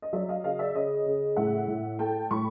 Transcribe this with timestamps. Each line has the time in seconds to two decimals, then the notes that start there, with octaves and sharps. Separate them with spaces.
0.02 D#5
0.13 F#3 D5 E5
0.29 D#5 F5
0.44 C#3 D#5 F5
0.59 D5 E5
0.75 C#3 C#5 D#5
1.06 C#3
1.36 A2 E5 F#5
1.68 A2
1.99 A3 G5 A5
2.31 A2 B5 C#6